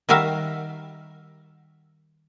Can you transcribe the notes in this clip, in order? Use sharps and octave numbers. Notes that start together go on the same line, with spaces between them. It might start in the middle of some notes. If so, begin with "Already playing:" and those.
D#3 G3 F#4 A#4 E5 F5